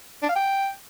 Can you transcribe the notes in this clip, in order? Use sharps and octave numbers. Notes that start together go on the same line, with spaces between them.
D4
F5
G5